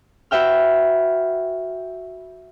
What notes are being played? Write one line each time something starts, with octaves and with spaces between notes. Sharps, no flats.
F#4 B4 E5 G5 F6